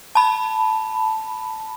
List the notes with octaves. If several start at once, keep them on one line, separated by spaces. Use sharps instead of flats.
A5 B5